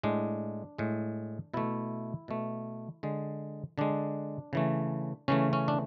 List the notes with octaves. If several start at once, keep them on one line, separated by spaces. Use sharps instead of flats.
A2 G#3 D4
A2 G#3
B2 A3 E4
B2 A3
D3 G#3
D3 G#3 D4
C#3 E3 A3
C#3 E3 A3 C#4
C#4
D4